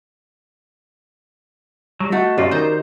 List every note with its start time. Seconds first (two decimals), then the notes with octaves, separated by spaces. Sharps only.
2.00 F#3 G3
2.12 A3 F#4 D#5
2.38 F#2 A#2 C#4 F4 G4 D5 D#5
2.51 D#3 D#4 A#4 C5 A#5 C6